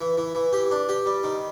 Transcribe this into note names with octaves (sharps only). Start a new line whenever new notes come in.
E3
E3
E3
G4
D4
G4
G3
D#3